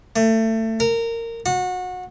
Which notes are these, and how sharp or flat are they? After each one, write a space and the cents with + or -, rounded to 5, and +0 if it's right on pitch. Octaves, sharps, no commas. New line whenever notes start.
A3 +25
A#4 -20
F#4 -25